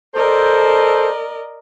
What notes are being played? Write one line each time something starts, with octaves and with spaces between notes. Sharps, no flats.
A4 A#4 C5 D5 D#5